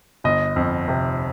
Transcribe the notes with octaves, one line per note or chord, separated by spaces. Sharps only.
G1 D#5
F2
C3